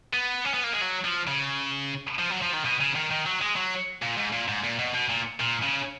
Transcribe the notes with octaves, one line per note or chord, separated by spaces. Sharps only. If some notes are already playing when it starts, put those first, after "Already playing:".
B3
C#4
B3
A#3
G#3
F#3
F3
C#3
F3
F#3
F3
D#3
B2
C#3
D#3
D#3
F#3
G#3
F#3
A#2
G#2
A#2
G#2
A#2
B2
B2
A#2
A#2
C#3